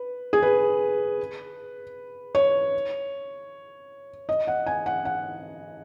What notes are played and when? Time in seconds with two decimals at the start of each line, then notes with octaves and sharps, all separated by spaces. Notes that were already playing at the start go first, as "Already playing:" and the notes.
Already playing: B4
0.33 G#4
0.42 B4
2.35 C#5
4.29 D#5
4.47 F#5
4.66 G#5
4.86 F#5
5.05 F#5